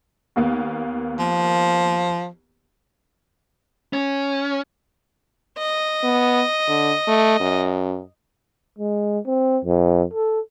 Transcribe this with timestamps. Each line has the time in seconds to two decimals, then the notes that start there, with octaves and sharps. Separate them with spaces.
0.36 D#2 A#3 B3
1.19 F3
3.93 C#4
5.58 D#5
6.03 B3
6.68 D3
7.07 A3
7.40 F#2
8.79 G#3
9.26 C4
9.65 F2
10.13 A4